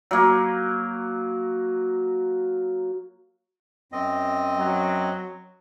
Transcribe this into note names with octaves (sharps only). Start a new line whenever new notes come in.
F#3 A#3
F#2 C4 D#5
F#3